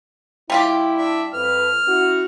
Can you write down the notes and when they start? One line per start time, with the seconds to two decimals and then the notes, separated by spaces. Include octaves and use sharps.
0.50 G3 E4 F4 G4
0.97 D4 E5
1.34 F2 B4 F6
1.87 C#4 E4 F#4